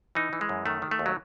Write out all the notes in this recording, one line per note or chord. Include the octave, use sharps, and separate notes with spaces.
E3 D#4
E3
G#3
F#2
D#3 A3
D#3
A3
D#2
F#3